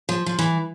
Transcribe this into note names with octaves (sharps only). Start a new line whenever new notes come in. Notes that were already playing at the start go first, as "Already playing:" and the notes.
F3
F3
E3